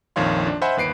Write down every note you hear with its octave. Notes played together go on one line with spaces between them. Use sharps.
A#1 F2 D#3 C#5 F5 C6
D4
C5 D#5 E5 F#5 G#5 B5
G1 D#2 B4 C7 D7